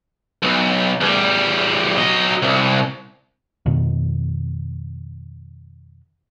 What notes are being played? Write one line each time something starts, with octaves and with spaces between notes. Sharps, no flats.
B1
E2 G3
F#3 D#5
C2
F2 B2 D#3